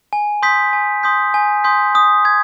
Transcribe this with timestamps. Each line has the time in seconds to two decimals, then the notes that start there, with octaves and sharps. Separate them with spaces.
0.13 G#5
0.42 C6 D#6 G6 B6
0.73 G#5
1.03 C6 D#6 G6 B6
1.34 G#5
1.64 C6 D#6 G6 B6
1.95 D#6
2.25 G#6